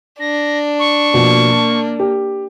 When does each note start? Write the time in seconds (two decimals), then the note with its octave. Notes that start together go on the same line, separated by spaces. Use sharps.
0.20 D4 A#6
0.79 C#6
1.14 B2 F3 A#3
1.49 A5
2.00 G4